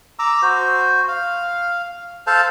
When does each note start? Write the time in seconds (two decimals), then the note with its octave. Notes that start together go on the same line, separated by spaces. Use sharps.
0.19 A#5 D6 E6
0.42 F#4 C5
1.08 F5
2.27 A4 C5 F5 A5